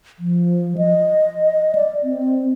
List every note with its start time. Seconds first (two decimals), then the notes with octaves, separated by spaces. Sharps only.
0.19 F3
0.78 D#5
1.75 D5
2.03 C4